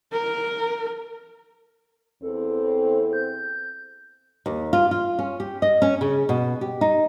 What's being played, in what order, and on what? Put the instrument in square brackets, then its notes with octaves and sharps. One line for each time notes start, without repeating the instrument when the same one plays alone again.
[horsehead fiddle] A#4
[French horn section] E2 C4 [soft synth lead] A4
[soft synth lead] G6
[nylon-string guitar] D#2
F4
F4
C#4
G4
D#5
C#4
C#3
B2
G4
D#4